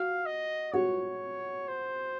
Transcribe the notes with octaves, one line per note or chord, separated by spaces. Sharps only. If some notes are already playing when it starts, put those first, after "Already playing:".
Already playing: F#4 F5
D#5
F#4 C#5
C5